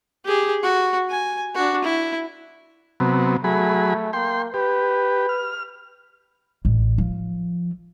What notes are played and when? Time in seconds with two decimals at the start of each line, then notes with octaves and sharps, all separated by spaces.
0.25 G4 G#4
0.63 F#4
1.10 G#5
1.55 D4 F#4
1.84 E4
3.00 C3 F#3 B3
3.44 F#3 A3 G#4 B5
4.13 A#3 G5 C6
4.54 G4 B4
5.29 F6
6.65 A1
6.98 F3